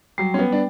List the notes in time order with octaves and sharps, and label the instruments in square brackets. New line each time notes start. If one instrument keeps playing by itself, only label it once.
[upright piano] F#3 [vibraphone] G3
[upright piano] C#4
B3
D4